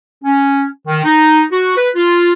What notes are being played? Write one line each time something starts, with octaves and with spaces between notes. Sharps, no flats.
C#4
D#3
D#4
F#4
B4
F4